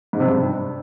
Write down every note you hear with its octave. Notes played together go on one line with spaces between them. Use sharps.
G#2
C3
G2